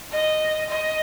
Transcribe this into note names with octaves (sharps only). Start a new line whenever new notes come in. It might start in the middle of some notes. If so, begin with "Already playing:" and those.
D#5
D#5